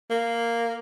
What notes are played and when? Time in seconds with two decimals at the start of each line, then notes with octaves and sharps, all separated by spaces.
0.10 A#3